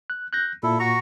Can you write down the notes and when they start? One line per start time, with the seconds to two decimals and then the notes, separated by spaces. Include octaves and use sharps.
0.10 F#6
0.33 F#6 G6 A#6
0.63 A#2 E4 A4
0.79 F#4 A#5 C#6